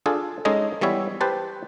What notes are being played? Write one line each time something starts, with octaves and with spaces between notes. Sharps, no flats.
D4 F4 G#4 A4
G#3 C#4 D#4 G#4 A4 D#5
E3 G3 B3 C#5 E5
G4 B4 C5 A5